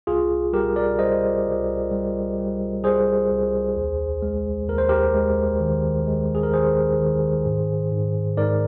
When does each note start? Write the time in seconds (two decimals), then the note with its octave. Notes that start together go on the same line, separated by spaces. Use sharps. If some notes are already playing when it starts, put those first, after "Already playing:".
0.07 C2 F4 G#4
0.53 G3 G4 A#4
0.76 A#4 D5
0.99 G3 C5 D#5
1.46 C2
1.91 G3
2.38 G3
2.84 G3 G#4 C5
3.31 C2
3.76 D#2
4.22 G#3
4.68 D#2 A#4
4.78 C5
4.89 G4 A#4
5.14 G#3
5.60 D#3
6.07 G#3
6.35 G#4
6.43 A#4
6.53 D#3 G#4 C5
7.00 D#3
7.46 G#2
7.92 G#2
8.37 G#2 A#4 D5